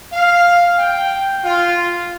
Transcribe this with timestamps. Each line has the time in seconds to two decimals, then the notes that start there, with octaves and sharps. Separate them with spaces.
0.13 F5
0.78 G5
1.44 F4